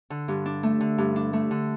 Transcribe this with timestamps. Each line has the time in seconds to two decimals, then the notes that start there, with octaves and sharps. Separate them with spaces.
0.10 D3
0.28 G2
0.46 D4
0.63 A3
0.80 D3
0.98 G2
1.16 D4
1.33 A3
1.51 D3